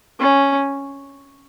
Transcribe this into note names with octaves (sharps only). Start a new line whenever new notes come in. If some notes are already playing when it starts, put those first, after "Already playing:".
C#4